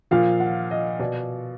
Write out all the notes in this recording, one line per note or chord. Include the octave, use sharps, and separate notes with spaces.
A#2 F3 F5
F#5
D#5
B2 D5